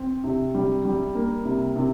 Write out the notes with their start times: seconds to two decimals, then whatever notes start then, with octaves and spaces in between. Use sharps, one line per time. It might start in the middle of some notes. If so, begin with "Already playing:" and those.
Already playing: C4
0.24 C3
0.55 G3
0.85 G3
1.15 A#3
1.45 C3
1.76 C3